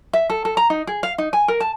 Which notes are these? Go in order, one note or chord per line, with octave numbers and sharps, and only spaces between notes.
E5
A4
A4
A#5
D#4
G#4
F5
D#4
G#5
A#4
A5